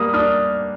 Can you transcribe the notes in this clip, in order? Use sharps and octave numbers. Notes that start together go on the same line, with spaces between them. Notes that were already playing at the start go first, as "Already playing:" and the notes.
Already playing: G3 A#3 D#6 F6
D4 D#6 F6